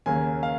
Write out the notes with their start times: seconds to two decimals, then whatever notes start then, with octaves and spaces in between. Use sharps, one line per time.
0.06 D#2 C#3 A#3 G#5
0.43 F5